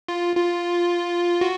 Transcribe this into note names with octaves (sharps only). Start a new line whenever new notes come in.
F4
F4
F#4